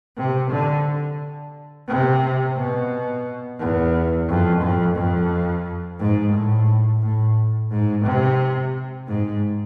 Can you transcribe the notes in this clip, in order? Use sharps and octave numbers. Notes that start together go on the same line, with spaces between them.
C3
D3
C3
B2
E2
F2
F2
F2
G#2
A2
A2
G#2
C3
G#2